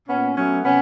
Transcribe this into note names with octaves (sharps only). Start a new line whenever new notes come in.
A#2 B3 C#4
F#3 A3 B3 C#4
C3 B3 C#4